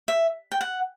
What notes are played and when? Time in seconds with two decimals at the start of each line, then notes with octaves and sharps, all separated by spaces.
0.08 E5
0.52 G5
0.61 F#5